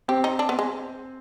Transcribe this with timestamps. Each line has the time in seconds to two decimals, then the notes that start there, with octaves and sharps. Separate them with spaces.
0.08 C4 G4
0.24 D#4
0.39 D4
0.49 B3
0.59 G#3